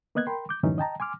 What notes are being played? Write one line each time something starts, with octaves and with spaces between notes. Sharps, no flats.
A#3 B3 D#5 F#6 G#6
A#4 G5 B5 C6
D6 G6
F#2 A2 D3 E3 C#4 D#4
D#5 G5 A5 A#5
G#5 C6 D6 F6